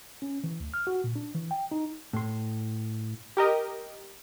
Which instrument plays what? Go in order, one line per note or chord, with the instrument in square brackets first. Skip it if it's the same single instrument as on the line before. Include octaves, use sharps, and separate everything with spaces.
[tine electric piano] C#4
E3
D2
F6
F#4
A#2
D4
E3
G5
D#4
[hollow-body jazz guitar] A2 C6
[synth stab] G4 A#4 D#5